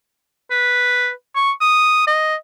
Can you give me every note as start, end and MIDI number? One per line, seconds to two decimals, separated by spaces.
0.51 1.11 71
1.35 1.52 85
1.61 2.05 87
2.07 2.36 75